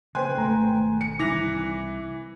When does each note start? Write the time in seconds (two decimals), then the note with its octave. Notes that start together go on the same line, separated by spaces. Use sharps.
0.15 C#3 A#3 B4 C5 G5 G#5 C6 F#6
0.37 G#1 B2 A3 A#5
1.01 C#7
1.19 C2 E3 D6 F#6 A#6 F7